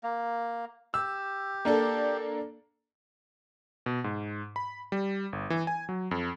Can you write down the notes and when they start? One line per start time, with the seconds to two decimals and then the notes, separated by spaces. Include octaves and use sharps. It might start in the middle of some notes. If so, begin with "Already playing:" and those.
0.03 A#3
0.94 G4 E6
1.65 A#3 D4 A4
3.86 B2
4.04 G#2
4.56 B5
4.92 G3
5.33 G1
5.50 E3
5.67 G#5
5.89 F#3
6.11 F2